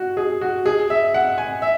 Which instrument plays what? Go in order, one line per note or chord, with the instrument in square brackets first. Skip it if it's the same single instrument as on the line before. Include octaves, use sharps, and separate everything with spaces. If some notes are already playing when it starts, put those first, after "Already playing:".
Already playing: [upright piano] F#4
G#4
F#4
G#4
E5
F#5
G#5
E5